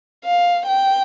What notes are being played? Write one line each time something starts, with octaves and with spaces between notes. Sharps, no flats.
F5
G5